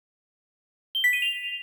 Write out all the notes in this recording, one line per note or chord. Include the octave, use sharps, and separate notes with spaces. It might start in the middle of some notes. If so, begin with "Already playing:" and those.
G7
B6
D#7
F7